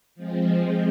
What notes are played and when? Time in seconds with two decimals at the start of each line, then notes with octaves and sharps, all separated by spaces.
0.15 F3 G#3 C4